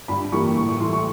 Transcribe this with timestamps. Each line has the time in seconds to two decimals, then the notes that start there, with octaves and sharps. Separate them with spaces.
0.08 G2 B5
0.32 E3 G3 A#3 C#6
0.57 A2 C#6
0.69 C#6
0.80 E3 A3 C6
0.93 C#6